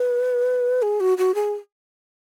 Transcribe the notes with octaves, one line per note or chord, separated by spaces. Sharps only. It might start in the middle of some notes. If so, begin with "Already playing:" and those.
Already playing: B4
G#4
F#4
F#4
G#4